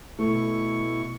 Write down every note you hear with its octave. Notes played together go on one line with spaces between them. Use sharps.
B2 A3 E4 C#6